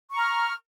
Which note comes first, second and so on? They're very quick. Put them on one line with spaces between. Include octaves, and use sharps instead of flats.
C#6 A#5 F6